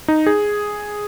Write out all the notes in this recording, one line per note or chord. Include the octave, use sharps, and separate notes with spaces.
D#4
G#4